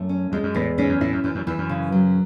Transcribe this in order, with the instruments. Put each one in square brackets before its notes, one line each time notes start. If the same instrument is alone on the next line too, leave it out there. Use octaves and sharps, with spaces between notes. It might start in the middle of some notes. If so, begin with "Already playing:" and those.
Already playing: [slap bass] F#2 [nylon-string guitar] A3
[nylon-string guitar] C#4
[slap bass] E2 [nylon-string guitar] G#3
[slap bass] F#2
[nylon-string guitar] E2 [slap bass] A2
[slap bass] G#2 [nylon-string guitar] C#4
[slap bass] F#2
[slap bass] A2 [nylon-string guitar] E4
[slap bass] F#2
[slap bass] F#2 [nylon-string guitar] E3
[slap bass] F#2
[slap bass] E2 [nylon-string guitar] E3
[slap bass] F#2
[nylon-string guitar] C#3
F#3